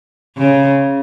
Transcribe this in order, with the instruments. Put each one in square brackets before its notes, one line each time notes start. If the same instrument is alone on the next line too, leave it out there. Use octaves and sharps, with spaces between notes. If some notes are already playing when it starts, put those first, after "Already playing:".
[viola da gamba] C#3